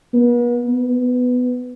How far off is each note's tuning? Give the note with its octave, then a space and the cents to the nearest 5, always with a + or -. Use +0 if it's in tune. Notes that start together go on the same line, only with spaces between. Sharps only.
B3 -40
B3 +10